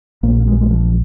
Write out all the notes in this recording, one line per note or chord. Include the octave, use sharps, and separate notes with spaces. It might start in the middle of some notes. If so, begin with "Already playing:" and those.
A#1 A#2 A#3
A#3
G#3
G#3
F3